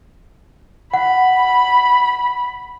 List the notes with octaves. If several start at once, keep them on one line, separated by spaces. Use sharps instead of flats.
F#5 B5